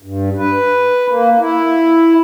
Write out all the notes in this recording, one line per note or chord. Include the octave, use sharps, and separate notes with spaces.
G2
B4
A#3
E4